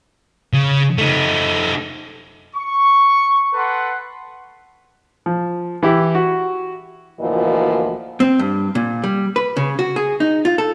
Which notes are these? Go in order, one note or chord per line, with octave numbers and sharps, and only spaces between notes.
C#3
A3 D#4
C#6
A4 B4 F#5 C6
F3
E3 E4 G4
F#4
D2 A#2 E3 F3 F#4 D#5
C4
G2
A#2
G3
B4
C#3
F#4
G#4
D#4
F4
A4